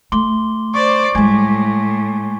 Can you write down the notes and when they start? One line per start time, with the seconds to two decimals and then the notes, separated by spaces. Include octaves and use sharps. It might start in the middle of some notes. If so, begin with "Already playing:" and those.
0.12 A3 C6 D6 G7
0.74 C5 D5 C#6 D6
1.15 A2 G3 G#3 G#5 G#6